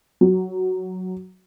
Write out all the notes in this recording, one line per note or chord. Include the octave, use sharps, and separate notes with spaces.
F#3